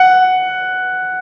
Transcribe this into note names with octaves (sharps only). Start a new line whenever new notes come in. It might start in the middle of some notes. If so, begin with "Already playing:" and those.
Already playing: F#5